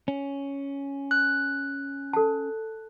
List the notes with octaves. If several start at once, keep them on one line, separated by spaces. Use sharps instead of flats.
C#4
F#6
A4 A5